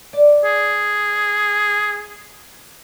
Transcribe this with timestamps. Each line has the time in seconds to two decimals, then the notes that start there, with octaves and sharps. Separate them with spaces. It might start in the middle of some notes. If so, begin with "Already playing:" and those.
0.13 D5
0.45 G#4